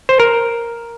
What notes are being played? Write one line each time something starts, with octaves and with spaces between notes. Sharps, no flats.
C5
A#4